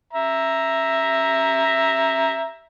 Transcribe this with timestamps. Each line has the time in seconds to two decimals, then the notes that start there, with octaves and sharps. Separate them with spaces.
0.13 E5 A#5